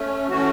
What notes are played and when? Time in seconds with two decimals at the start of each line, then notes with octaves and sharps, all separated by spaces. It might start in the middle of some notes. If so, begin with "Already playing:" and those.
Already playing: A3 C#4
0.29 E3 A3 C#4 F#4